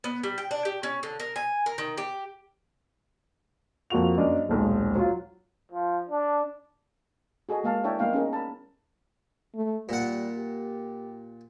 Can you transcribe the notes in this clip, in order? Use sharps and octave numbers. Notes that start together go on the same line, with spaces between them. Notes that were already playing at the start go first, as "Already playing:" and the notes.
B3
G3
G5
D4
G4
C#4
D3
A#4
G#5
A#4
D#3
G4
F2 A#3 F4 F#4 F7
F#2 A#3 D4 D#5
D#1 B1 G#3
F#3 F4
F3
D4
F#4 G#4 A4 D#5
G#3 A#3 F5 A5
D4 E4 C#5 E5 G5 A5
G3 A#3 B3 D#4 F5 G5
C#4 D#4 G#4 A#4
A5 B5
A3
A#2 G3 F#5
G4